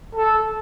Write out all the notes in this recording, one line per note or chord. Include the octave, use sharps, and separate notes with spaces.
A4